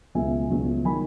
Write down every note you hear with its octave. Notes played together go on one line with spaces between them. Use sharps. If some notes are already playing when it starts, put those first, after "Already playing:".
C#2 B2 F#3 E5 G#5
C#2 B2 F#3
D#3 F#3 G#5 B5